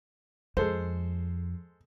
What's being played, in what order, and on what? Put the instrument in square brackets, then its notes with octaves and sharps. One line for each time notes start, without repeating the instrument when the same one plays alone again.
[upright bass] F2 [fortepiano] G#3 A4 C5